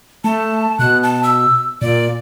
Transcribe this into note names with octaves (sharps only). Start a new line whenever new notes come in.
A3 A5
B2 F#6
A5
E6
A#2 D5